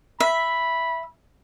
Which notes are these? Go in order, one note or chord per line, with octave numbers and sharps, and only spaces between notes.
E5 B5